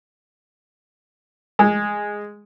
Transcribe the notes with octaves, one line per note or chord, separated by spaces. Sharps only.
G#3